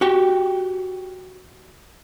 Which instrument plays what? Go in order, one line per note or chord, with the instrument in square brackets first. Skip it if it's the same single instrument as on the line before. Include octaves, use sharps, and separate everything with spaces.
[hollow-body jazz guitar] F#4 G4 G5